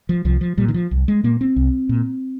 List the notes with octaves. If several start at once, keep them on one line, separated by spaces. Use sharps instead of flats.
F3
C2 F3
F3
A#2 G3
D#3
F3
C2
G#3
A#2 A#3
C4
C2
A#2